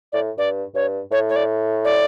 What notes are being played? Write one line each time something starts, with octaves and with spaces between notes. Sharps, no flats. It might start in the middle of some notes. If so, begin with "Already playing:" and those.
A2 D5
G2 D5
G2 C#5
A2 C#5
C#5
D5
D5